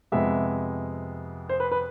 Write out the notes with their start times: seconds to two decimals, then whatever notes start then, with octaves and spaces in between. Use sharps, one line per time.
0.12 F2 C3 G#3 B3 E5
1.49 C5
1.60 B4
1.72 B4